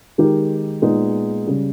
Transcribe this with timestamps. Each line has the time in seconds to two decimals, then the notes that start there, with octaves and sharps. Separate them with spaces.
0.18 D#3 G#3 D#4 G4 A#4
0.82 A#2 G#3 B3 D#4 G#4
1.47 C#3 G3